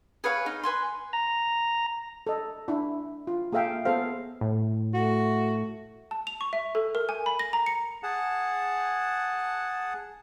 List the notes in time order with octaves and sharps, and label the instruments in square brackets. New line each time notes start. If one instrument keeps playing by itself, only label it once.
[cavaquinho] G#4 B4 C#5 F5
D#4
B4 G#5 C6
[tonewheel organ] A#5
[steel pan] A4 D#5
D4 E4
F4
A#3 G#4 A4 E5 F5 G5
B3 G#4 A4 C5 F5
[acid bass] A2
[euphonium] A3 [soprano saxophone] F#4
[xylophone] A5
F7
C#6
E5
A4
A#4
G#5
B5
A#6
A#5
C#7
[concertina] G#4 F#5 A5